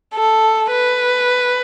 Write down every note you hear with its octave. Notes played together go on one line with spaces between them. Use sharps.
A4
B4